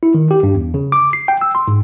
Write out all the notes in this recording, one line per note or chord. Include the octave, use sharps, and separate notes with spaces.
E4
D#3
G4
G2
E2
C#3
D6
C7
G5
E6
C6
G#2